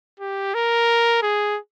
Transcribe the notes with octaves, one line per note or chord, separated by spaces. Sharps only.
G4
A#4
G#4